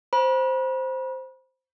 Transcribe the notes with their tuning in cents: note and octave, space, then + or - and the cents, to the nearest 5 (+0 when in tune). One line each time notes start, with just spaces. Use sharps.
C5 +0 B5 -40